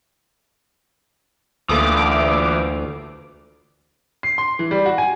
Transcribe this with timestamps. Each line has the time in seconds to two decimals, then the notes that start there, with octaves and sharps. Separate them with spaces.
1.69 D2 E3 A#3 F4 A4 D6 D#6
4.23 C7
4.38 C6
4.59 E3
4.71 G3
4.86 F#4
4.98 G#5